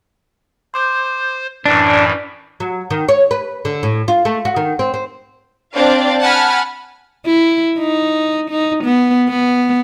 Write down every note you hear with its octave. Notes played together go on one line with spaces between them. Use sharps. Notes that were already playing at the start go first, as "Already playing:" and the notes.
C5 C6 D6 G6
F#2 A2 E3 D4 D5
F#3
D#3
C#5
B4
D3
A2
F4
A3
F#4
D#3
C4
C4
C4 D4 D5 F5
F#5 G#5 A5 B5 F6
E4
D#4
D#4
B3
B3